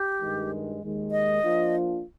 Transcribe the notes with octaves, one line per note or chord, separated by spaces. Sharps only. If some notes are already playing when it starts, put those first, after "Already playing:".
Already playing: G4
G2 D#3 G#3
D#2 D#3 G#3
D#5
F3 A#3 D4 F4